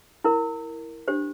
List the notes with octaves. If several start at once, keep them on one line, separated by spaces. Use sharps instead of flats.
E4 A#4
D4 G4 C5